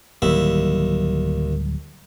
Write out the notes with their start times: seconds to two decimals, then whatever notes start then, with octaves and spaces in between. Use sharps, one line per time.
0.22 D1 D#2 F#3 G3 E4